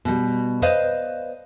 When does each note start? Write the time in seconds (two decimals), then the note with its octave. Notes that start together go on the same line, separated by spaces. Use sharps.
0.05 B2 G3
0.62 B4 C5 D5 D#5 F5